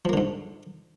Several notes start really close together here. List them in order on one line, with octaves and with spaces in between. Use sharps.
F3 A#3 D3 G#2